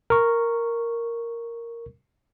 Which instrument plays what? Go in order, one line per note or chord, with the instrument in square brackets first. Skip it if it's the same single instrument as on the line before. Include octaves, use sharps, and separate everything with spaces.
[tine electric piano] A#4 C#6